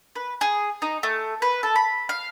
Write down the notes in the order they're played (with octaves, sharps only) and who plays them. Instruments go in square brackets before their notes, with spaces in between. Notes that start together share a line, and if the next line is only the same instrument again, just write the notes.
[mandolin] B4
G#4
D#4
A3
B4
A4
B5
F5